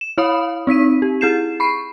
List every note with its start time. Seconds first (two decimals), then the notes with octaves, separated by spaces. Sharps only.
0.01 E7
0.18 E4 C#5 F5 B5 D#6
0.67 C4 D#4 B6 D#7
1.02 G4
1.21 E4 G#4 G6 C7 E7
1.60 B5 C#6 C7